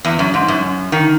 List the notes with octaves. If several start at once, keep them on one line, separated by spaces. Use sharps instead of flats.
E2
F#2
G#2
F#2
D#3